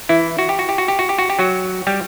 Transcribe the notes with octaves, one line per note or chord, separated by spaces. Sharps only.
E3 E4
F#4
G4
F#4
G4
F#4
G4
F#4
G4
F#4
G4
F#3 F#4
G3 G4